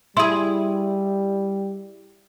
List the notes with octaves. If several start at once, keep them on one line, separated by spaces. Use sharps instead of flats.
G3 E4 G#4 C6